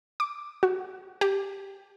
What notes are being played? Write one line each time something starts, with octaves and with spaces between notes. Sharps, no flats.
D6
F#4
G4